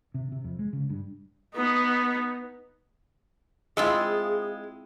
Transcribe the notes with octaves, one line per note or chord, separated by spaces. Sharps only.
C3
C3
F2
G#3
C#3
G2
B3 D#4
G#3 C4 E4 F4 G#4